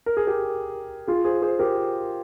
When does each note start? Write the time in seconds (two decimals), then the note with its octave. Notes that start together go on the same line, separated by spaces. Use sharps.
0.06 A#4
0.17 G#4
0.27 G4 A#4
1.07 F4 G#4
1.24 G#4 C5
1.42 G#4 C5
1.59 G4 A#4